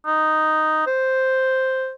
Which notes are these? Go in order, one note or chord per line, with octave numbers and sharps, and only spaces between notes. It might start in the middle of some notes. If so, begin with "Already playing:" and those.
D#4
C5